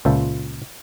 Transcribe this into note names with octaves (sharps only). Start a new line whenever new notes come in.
C#2 A#2 F4 C5 E5 A5